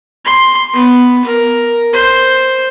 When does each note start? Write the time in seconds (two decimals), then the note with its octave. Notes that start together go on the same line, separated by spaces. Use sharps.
0.25 C6
0.73 B3
1.25 A#4
1.93 C5